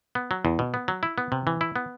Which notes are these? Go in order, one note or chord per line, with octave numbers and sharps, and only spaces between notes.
B3
F#3
E2
B2
B3
F#3
E4
B3
C3
E3
E4
B3